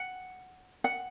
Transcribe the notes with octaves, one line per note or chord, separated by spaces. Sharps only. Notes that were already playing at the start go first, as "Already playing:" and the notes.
Already playing: F#5
F#5